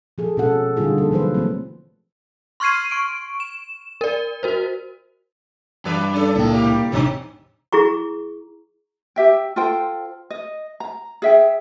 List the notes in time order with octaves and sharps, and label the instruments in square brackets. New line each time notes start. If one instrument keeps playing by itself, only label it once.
[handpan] F3 G#4 A4
B2 G#3 C#4 F#4 A4 F#5
D3 G3 D#4 F4 G#4
F3 A#3 A4
D3 E3 F#3 B4 C5
F3 A3 A#3 C4
[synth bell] C6 C#6 F6 G#6 C7 D#7
C#6 D7
E7
A#4 D5
F#4 A#4 C5
[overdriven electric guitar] G2 [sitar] E3 B4 D5
[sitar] C#4 D4 A4
[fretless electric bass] C#2 A#2 [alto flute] A#3 [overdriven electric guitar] E4 G5
[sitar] G3 G4
[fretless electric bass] A1 E2 G#2 [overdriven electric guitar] C3 [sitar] D#3 D4 D#4 [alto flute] C#5
[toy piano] E4 G#4 A#5 C#6
[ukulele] G4 E5 G5
F4 A4 C5 G5
D#5
A#5
G#4 E5 G5